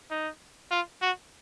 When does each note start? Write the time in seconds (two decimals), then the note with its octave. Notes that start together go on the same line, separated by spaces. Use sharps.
0.11 D#4
0.71 F4
1.02 F#4